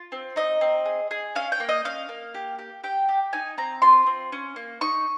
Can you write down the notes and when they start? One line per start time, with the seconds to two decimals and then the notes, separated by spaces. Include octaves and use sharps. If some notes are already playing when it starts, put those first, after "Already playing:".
Already playing: F4
0.12 C4
0.36 D#4 D#5
0.61 C4
0.86 G#4
1.11 G#4
1.35 C#4 F5
1.52 G5
1.60 A#3
1.69 D#5
1.85 C#4 F5
2.09 A#3
2.34 G4
2.59 G4
2.84 G4 G5
3.09 G4
3.33 D#4 G#5
3.58 C4 A#5
3.82 F4 C6
4.06 C4
4.32 C#4
4.56 A#3
4.81 D#4 C#6